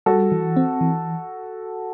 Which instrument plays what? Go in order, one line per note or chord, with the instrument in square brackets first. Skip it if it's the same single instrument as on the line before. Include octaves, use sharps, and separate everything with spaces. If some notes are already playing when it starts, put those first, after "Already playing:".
[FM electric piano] G3 [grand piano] F#4 A4
[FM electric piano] E3
C4
E3